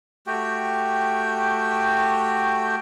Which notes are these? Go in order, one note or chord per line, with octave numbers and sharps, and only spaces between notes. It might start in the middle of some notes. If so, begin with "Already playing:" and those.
A3 F#4 G4 G5